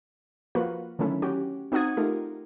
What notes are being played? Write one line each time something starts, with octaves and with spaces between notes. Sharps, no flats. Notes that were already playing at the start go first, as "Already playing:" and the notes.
F3 A#3 F4 F#4 B4
D3 D#3 F#3 A3 C#4 E4
C#4 F#4 G4
C4 D#4 F#4 F#5 D#6 G#6
A3 D#4 F4 G4 A#4